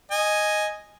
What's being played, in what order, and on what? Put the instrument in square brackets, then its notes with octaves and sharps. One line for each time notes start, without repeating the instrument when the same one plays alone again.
[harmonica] D#5 G#5